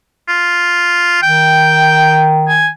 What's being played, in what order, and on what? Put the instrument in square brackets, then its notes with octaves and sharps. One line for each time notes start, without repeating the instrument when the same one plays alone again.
[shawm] F4
[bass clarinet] D#3 [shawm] G5
[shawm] G#5